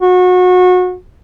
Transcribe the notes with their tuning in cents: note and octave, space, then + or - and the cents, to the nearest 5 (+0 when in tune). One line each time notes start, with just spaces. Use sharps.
F#4 -30